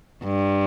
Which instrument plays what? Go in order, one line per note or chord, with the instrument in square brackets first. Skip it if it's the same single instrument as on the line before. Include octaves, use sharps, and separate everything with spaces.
[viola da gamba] G2